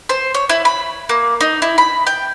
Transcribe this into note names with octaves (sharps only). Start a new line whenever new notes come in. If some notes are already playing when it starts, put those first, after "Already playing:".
C5
C#5
E4
B5
A#3
D#4
E4
B5
G5